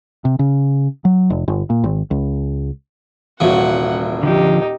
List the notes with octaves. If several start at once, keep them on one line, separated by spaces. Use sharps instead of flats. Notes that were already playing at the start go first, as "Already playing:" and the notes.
C3
C#3
F#3
F1
G1
A#2
G#1
C#2
D#1 C2 C#3 E3 F#4 F#5
D3 F3 D#4 G4